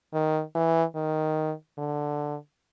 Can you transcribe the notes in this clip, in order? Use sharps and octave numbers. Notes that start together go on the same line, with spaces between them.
D#3
E3
D#3
D3